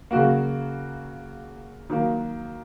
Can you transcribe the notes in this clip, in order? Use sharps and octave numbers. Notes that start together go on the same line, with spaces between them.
C#3 F#3 A#3 F#4
D#3 F#3 A#3